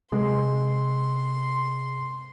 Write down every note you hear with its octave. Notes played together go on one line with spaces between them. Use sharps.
C3 G#3 C6